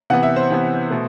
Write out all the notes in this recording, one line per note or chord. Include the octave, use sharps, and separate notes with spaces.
C3 E3 B3 F#5
E5
C5
C3 E3 B3
B2 A3